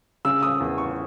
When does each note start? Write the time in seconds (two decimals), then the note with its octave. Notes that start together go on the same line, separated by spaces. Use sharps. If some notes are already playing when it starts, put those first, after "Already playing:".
0.25 C#3 E6
0.43 D#6
0.60 E2
0.78 C#6